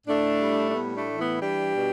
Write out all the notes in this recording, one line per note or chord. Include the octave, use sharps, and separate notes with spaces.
A2 A3 D4
G3
D4
A2 B3
A3 D4
E3
B3 E4
G3 D4 G4
B2